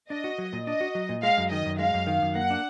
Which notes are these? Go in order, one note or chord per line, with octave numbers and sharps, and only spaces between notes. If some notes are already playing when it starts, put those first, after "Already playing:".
D4 D#5
F#4
F#3
A#2
D4 D#5
F#4
F#3
A#2
G#3 F5
F#2
D#3 D#5
F#2
G#3 F5
F#2
D#3
F#2
A#3 F#5
D4